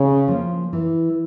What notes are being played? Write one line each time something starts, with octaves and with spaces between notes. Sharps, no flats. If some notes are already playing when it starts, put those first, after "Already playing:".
Already playing: C#3
F3 A#3
E3